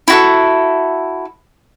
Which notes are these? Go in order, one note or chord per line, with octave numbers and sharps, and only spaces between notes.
E4 F#4 A4